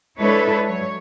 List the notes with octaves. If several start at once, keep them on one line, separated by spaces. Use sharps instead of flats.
G#3 D4 E4 A4 B4 C#5
F#3 C#5